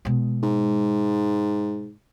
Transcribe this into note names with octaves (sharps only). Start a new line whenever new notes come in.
B2 G#3
G#2